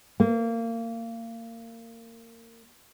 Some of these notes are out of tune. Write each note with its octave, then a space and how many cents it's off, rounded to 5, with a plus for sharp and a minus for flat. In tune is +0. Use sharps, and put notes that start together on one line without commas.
A#3 -25